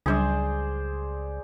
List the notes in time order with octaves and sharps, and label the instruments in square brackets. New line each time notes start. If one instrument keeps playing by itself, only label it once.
[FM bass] C#2 [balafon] F#3 G3 D4 [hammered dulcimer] G#4 C5 D5